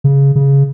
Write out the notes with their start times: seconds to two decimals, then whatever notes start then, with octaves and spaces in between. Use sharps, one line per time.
0.04 C#3
0.36 C#3